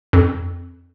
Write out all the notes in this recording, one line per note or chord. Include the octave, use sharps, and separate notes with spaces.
F2